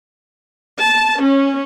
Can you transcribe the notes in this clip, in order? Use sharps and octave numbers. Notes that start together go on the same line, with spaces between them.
A5
C#4